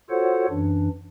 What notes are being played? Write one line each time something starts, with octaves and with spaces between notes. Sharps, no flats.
F4 F#4 A4 C5 C#5 F#5
F#2 E3 D4